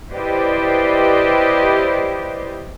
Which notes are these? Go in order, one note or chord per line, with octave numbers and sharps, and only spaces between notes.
E4 G4 B4 C5 D5 D#5